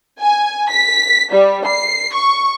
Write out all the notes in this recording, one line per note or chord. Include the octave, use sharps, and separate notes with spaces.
G#5
B6
G3
C7
C#6